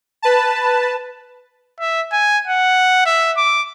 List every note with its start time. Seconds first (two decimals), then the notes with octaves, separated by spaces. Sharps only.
0.22 B4 A5
1.80 E5
2.12 G#5
2.47 F#5
3.06 E5
3.37 D6